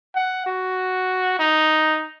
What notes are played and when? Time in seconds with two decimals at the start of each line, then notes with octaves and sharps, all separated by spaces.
0.16 F#5
0.46 F#4
1.39 D#4